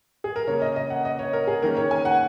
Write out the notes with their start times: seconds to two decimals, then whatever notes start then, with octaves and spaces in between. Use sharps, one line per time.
0.24 G#4
0.36 A#4
0.47 C#3 A#3 C#4 C#5
0.62 D#5
0.76 D#5
0.90 F#5
1.05 D#5
1.19 C#5
1.33 A#4
1.47 G#4
1.62 D#3 A#3 C#4 A#4
1.77 C#5
1.91 G#5
2.05 F#5